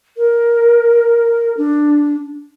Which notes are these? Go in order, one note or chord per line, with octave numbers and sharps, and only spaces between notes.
A#4
D4